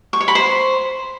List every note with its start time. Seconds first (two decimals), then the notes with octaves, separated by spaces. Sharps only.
0.13 C#6
0.20 C#5
0.28 B5
0.35 C5